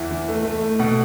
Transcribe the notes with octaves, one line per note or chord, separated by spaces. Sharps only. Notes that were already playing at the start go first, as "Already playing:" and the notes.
Already playing: E2 E3 E5
E3
A3
A3
A3
B2 F#5